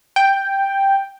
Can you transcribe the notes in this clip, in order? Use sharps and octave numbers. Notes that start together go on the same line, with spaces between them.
G5